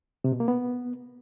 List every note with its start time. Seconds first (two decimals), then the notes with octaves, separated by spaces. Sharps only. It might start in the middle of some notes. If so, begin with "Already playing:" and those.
0.24 C3
0.32 B2
0.40 A#3
0.48 B3